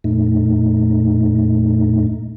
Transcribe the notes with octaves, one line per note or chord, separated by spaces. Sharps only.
F2 A#2 A3 D#4